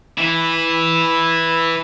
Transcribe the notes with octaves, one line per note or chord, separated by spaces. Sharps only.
E3 E4